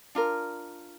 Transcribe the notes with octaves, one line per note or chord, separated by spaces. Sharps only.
D4 F4 A#4